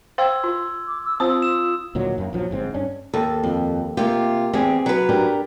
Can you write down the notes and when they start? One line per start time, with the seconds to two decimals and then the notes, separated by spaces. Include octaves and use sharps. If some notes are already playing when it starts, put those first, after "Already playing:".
0.18 C5 F5 G5 C6 E6 G#6
0.44 F4
0.87 D6
1.04 E6
1.20 C4 F4 C5 D#6 E6
1.42 E6 E7
1.95 D2 A#2 D#3 F#3
2.18 F#2 A#3
2.33 A#1 F3 F#3
2.51 G1 G#2 C4
2.74 G2 C#4 D4
3.14 D#2 A4
3.44 F2
3.97 C3 A#3 F4 G4
4.53 E2 C4 G4 G#4
4.86 F#3 B4
5.09 D4 G4 A#4